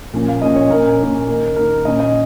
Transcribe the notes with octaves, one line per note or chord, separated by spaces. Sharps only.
A#2 F3 A#3 C#4
F5
A#2 F3 A#3 C#4 D#5
C#5
A#2 A#3 C#4 A#4
A#2 A#3 C#4
D#3 A#3 D#4
D#3 A#3 D#4 A#4
A#2 A#3 C#4 D#5
D#5